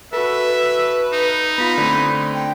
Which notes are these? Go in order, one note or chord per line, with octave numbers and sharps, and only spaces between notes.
F#4 A4 B4 E5
D#4
B3 F4 B5
D3 A3 C4
G5